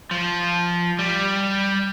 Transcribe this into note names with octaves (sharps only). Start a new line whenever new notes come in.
F3
G3